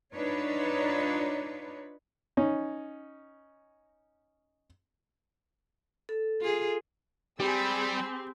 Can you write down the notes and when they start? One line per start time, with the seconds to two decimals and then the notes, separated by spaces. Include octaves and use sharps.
0.14 D4 D#4 F4 B4 C#5
2.37 C#4 D#4
6.09 A4
6.41 F4 G#4
7.40 G3 C4 G4 G#4 B5 E6